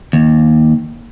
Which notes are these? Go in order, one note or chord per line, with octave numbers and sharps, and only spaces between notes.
D#2